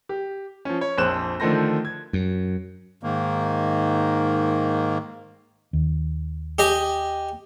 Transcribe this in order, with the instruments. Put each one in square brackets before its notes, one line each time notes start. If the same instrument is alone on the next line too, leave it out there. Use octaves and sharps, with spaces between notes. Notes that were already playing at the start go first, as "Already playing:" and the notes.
[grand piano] G4
F3 C#4
C#5
A#1 F2 C5 F#6 E7
D3 D#3 F3 A3 C5 A#6
G#6
[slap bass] F#2
[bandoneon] G#2 D#3 A#3
[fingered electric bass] D#2
[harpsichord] G4 D#5 G#5